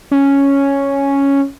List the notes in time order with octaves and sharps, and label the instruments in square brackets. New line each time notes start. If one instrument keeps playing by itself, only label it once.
[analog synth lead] C#4